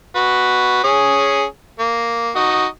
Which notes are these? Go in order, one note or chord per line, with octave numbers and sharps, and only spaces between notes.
F#4 B4
C#4 G#4
A#3
D#4 F#4 D#5